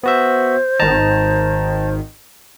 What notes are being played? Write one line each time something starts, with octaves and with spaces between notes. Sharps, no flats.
B3 F#4 C5 E5
G#1 D#3 A5 A#5